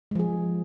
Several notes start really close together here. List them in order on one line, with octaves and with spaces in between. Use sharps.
G#3 F3 G#4